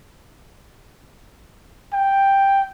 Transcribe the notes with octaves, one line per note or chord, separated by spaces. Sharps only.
G5